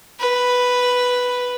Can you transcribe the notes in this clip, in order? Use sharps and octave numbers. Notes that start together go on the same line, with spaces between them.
B4